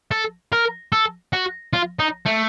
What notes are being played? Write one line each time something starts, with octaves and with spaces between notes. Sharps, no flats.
A4
A#4
A4
F#4
F4
D#4
A3